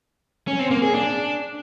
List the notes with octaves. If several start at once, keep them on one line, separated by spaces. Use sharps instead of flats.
C#4
C4
A#3
G#4
D4